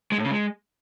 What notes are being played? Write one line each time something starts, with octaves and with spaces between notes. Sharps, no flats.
G#3
A2
C#3
G#3